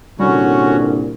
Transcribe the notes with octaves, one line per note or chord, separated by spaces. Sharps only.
C2 A#2 D3 G3 C#4 F#4